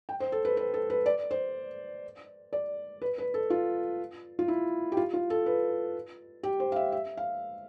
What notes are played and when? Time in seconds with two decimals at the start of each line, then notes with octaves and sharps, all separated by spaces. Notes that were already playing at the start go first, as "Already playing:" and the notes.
0.09 G5
0.20 C5
0.32 A4
0.45 B4
0.57 B4
0.74 A4
0.90 B4
1.06 D5
1.31 C5
2.53 D5
3.02 B4
3.18 B4
3.34 A4
3.50 F4
4.39 F4
4.48 E4
4.92 G4
4.97 F4
5.14 F4
5.30 A4
5.46 B4
6.43 G4
6.60 C5
6.72 F5
6.76 E5
6.92 E5
7.17 F5